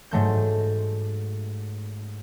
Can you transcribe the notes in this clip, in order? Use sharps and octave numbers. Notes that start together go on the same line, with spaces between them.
G#2 F#3 A3 G6